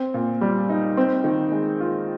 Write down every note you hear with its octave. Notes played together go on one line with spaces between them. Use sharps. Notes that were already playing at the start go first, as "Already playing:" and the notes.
Already playing: C4
A#2
G3
D#4
C4
D#3
G#3
F4